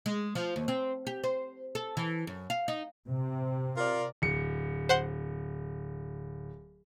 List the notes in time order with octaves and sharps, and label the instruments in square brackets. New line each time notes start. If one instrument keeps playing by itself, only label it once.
[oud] G#3
F3
D#2
C4
G4
C5
A4
E3
F#2
F5
D#4
[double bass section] C3
[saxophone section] F4 A#4 D5
[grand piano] D1 C#7
[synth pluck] C5 F#5 C6